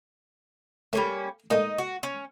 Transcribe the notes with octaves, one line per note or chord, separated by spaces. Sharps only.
G3 A3 A#3 C#4 C#6
A#2 G#3 A3 D#4 D#5
F#4
C#4